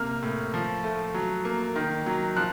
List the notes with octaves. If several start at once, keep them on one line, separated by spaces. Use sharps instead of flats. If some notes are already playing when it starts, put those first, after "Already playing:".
Already playing: C3 A#3 F6
A2
F3
A3
F#3
A#3
D#3
F#3
F3 F#6